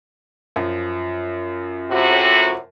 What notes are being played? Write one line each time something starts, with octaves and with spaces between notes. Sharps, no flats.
F#2 F3
A2 C3 F#4